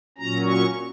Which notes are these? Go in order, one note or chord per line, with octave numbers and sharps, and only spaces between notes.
A#2 F#3 C#4 A#5
C#6